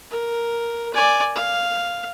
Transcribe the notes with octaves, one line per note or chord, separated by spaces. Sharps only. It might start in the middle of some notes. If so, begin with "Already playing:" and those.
A#4
D5 G#5
F5